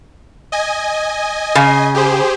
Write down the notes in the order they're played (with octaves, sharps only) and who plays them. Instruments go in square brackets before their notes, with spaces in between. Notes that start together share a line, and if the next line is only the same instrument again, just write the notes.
[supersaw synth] D#5 G#5
[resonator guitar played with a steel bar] C#3
[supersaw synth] G4 G#4 C5